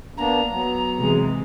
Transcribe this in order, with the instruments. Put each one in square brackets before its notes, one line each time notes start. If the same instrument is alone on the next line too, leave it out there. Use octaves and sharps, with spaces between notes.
[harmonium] A#3 B3 D4 [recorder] A#5
[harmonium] F#3 B3
[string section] C3 E3 G#3